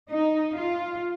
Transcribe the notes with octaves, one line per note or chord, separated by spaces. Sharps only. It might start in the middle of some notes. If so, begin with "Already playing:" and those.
D#4
F4